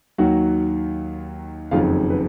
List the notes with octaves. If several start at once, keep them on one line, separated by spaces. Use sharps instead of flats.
D#2 D#3 F#3 F#4 F#5
F#1 F2 D#3 F#3 F4 F5
B4